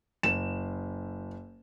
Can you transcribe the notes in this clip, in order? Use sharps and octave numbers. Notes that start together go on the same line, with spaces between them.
F#1 E7